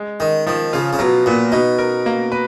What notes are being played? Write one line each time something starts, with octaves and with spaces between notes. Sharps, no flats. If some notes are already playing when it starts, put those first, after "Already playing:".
Already playing: G#3
D#3 D#4
D#3 F3
C#3 F4
C#3
B2 F#3
A#2 B3
B2 D#4
A#4
A#3
B4